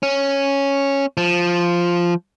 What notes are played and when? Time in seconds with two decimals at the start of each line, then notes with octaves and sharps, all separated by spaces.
0.03 C#4
1.17 F3